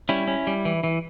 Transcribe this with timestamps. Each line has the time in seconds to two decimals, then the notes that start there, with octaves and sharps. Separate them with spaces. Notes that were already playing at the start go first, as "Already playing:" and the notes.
0.09 G3 C#4 E4
0.28 C#4
0.47 G3
0.65 E3
0.84 E3